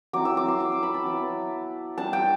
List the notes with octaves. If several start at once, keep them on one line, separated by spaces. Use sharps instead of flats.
F#3 C4 E4 D6
E6
D6
C6
E6
D6
B5
A5
F#3 B3 E4
G3 D4 A5
G5